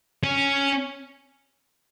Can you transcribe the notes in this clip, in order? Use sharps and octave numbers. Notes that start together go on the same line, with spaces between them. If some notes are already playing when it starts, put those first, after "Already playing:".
C#4